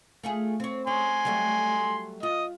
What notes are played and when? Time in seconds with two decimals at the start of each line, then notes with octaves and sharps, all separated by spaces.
0.23 A3 F4 G#4
0.60 C4 C#5
0.87 C#4 G#5 C6
1.25 F#3 G3 A3
2.23 F4 D#5